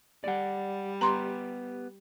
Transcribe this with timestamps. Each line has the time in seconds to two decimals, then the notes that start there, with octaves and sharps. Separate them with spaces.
0.24 G3 D5 F#5
1.01 B3 G4 A#5 C6